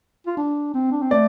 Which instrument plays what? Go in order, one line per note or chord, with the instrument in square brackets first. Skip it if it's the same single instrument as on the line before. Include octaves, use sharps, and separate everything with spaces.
[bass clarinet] F4
D4
C4
D4
C4
[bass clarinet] A3 [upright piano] D5